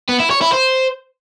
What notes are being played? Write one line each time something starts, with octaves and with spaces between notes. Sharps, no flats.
B3
E4
C#5
E4
C5